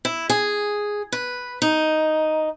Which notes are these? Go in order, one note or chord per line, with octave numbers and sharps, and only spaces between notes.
E4
G#4
B4
D#4